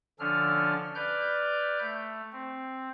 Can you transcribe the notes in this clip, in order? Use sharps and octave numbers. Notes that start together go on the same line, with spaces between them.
D3 F3 C#4 D4 A4 F6
B4 D5 F6 G6
A3
C4